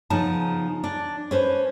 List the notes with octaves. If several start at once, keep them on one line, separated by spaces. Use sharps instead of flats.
C#3 F3 B3 D#4 A5
D4
C#4 B4 C5